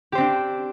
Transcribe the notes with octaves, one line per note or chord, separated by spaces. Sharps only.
C4 D4 G4 C5